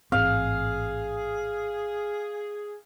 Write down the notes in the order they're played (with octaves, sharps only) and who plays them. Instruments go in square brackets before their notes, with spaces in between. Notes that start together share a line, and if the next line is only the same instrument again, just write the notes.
[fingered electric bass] A1 G#2 C4 [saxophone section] G#4 [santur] F5